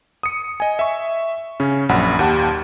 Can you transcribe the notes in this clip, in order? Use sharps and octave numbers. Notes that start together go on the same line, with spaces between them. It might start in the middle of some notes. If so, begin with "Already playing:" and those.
D#6 C#7
D#5 G#5
E5 C#6
C#3 C#4
A#1 F#2 F#5 B5
D#2 G4 F#5 A5